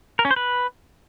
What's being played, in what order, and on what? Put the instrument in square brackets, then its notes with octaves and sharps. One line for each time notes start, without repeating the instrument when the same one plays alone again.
[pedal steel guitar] A#4
C#4
C5
B4